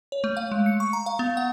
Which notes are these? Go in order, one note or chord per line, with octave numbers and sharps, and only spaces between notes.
C#5
A3
F5
G#3
C#7
C#6
A#5
F5
B3
F#5